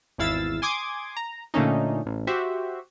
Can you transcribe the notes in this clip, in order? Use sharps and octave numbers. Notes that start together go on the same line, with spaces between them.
G#1 E2 E4 F5 E6 A6
G#5 C6 D6 D#6 G#6
A#5
A#2 D3 A3 A#3 C#4 D#4
A1
F#4 G4 C5 E5